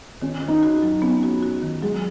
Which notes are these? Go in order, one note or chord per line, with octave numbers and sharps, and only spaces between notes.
D#3 C#4
D#3
D#4
F#4
F#3
B3 C#4
F#4
F#4
D#3
F#3 G#3